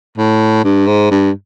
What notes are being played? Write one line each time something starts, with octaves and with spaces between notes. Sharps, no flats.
A2
G2
G#2
G2